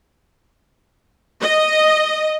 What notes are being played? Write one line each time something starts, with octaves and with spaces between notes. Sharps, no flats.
D#5